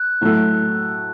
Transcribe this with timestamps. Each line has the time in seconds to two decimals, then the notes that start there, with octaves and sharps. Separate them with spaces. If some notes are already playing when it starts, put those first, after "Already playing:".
Already playing: F#6
0.21 A2 F#3 A3